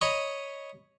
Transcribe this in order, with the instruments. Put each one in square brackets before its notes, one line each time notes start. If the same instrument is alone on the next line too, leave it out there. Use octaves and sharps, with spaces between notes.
[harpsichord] C#5 D#5 A#5 B5 C#6 D#6